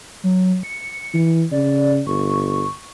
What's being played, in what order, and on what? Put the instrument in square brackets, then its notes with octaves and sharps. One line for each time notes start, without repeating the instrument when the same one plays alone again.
[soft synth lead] F#3
C#7
[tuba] E3
[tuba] C#3 [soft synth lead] D5
[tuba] G1 [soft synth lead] C#6